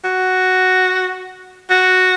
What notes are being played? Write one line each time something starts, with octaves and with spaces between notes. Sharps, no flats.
F#4
F#4